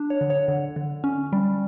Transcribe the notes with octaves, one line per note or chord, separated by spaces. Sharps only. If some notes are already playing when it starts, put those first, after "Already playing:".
Already playing: D4
C#5
D3
C#5
D3
D3
C#4
G3